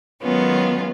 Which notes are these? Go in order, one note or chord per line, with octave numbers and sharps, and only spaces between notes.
D#3 F#3 G#3 B3 C#4 F4